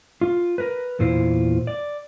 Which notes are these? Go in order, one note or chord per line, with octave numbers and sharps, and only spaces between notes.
F4
A#4 B4
E2 A#2 E4 F4 C5
D5